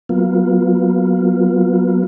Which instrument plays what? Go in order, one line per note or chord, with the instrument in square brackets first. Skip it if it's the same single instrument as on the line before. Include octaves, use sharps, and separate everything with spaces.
[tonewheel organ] F#3 A#3 B3 F4